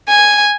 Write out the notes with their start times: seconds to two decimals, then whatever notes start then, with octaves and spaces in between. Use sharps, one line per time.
0.09 G#5